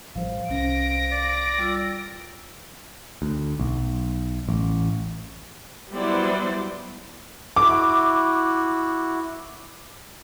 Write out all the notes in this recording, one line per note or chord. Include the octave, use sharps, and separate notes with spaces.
A1 F3 G3 C5 F5
C2 C#4 A#6 D7
D5
G3 F4 E6
D2
B1
A1
F#3 G3 B3 E4 C5 D5
E4 F#4 D6